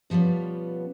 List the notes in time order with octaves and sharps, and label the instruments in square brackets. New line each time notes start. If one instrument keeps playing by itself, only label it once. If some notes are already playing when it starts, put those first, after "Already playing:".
[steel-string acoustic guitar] B2 F3 G3 B3 C#4